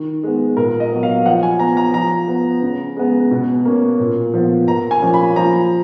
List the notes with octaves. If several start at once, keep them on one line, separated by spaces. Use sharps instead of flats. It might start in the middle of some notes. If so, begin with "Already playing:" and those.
Already playing: D#3
G#3 B3
A#2 A#4
D#5
F#3 B3
F5
F3 F#5
G#5
B3 A#5
A#5
F3 A#5
B3
C#3
G#3 B3
B2
A#3 C#4
A#2
F3 B3
A#2 A#5
G#5
F3 A#3 C#4
B5
F3 A#5